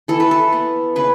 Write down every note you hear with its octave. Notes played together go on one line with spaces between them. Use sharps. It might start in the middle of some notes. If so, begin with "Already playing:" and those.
E3 A4
B4
A4
B3
C#3 B4